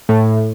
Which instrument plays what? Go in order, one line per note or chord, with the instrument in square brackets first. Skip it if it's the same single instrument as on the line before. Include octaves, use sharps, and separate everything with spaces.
[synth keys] A2